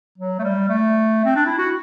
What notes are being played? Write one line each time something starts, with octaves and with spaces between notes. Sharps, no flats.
F#3
A3
G3
A3
C4
D4
E4
F#4